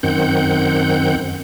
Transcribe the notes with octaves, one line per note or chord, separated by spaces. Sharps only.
F#2 D#3 C4 F#5 G6